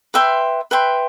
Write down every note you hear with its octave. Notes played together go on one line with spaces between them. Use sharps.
B4 E5 G5 C6
B4 E5 G5 C6